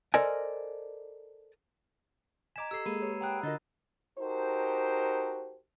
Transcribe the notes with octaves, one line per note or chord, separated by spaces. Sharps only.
A4 A#4 C5 D5 D#5 G#5
D#5 G#5 A#5 D6 G#6 B6 E7
G4 A4 E6 C7
G#3 A#3 G#4 B5 E6 D#7
G4 B4 C#5
F#5 G5 A#5 B5 D#6 E6 F#6
D3 F4 F#4 A#4 D#5 A6
D#4 F#4 G4 A4 A#4 C5